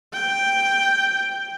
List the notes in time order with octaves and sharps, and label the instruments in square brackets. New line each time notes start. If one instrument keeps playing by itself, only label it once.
[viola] G5